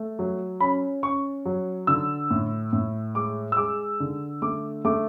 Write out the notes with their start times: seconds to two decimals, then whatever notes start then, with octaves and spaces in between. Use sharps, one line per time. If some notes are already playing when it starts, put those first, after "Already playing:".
Already playing: A3
0.19 F#3
0.60 C#4 B5
1.03 C#4 C#6
1.45 F#3
1.87 D3 E6
2.31 A2
2.73 A2
3.15 G#3 D6
3.52 E6
3.57 G#3 D6
4.00 D3
4.42 A3 D6
4.85 A3 D6